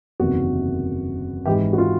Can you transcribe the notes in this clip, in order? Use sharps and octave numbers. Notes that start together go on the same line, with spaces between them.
F#1 E2 C3 D#3 F#4
G#1 G#2 E3 G4
F#4
F4